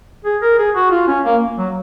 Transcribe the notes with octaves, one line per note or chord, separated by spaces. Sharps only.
G#4
A#4
G#4
F#4
F4
C#4
A#3
F#3